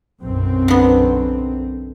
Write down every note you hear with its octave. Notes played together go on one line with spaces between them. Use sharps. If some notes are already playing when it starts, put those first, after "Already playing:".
B1 F#2 C4
D3 B3